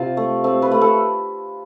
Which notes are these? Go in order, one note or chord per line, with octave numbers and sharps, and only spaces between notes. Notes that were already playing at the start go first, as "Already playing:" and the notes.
Already playing: C3 F4
A3
A3 C4
B4
A3
A4